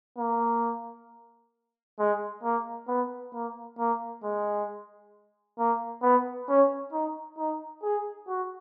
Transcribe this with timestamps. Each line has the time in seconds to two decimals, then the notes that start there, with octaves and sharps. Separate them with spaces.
0.18 A#3
1.99 G#3
2.43 A#3
2.88 B3
3.34 A#3
3.79 A#3
4.24 G#3
5.59 A#3
6.02 B3
6.49 C#4
6.92 D#4
7.38 D#4
7.83 G#4
8.28 F#4